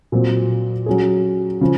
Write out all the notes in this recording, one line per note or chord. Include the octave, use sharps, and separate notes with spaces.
A#2 F#3 C4
F#3 C#4 G#4
C#3 F3